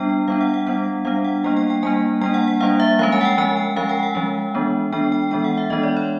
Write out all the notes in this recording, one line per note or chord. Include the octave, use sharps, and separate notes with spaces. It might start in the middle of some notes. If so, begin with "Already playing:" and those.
Already playing: G3 B3 D4 G5
G3 B3 D4 F5
F#5
F#5
G3 B3 D4 F#5
G3 B3 D4 F5
F#5
G3 A#3 D4 G5
G5
G5
G3 A#3 D4 G#5
G3 A#3 D4 G5
F#5
F#5
G3 A#3 D4 F5
E5
F3 G#3 C#4 F5
G#5
F#5
G5
F3 G#3 C#4 G#5
G5
F3 G#3 C#4 F5
G5
F#5
F3 G#3 C#4
E3 G#3 B3 D4
E3 G#3 B3 D4 G5
G5
E3 G#3 B3 D4 G5
F#5
E5
E3 G#3 B3 D4 D#5
D5
C#5